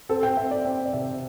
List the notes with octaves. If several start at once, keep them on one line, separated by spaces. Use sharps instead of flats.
C4 A4
G5
C4 E5
D5
C4 G5
D5
C3 E5